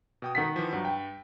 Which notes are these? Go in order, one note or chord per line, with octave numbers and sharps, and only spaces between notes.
B2 G5 D#6
D#3 F#5 B6
E3 F3
G2 F#3
G5